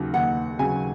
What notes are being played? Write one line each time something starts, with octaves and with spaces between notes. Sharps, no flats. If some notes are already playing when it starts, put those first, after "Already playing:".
Already playing: D#2 C#3 F#3
D#2 F#5
C#3 F#3 G#5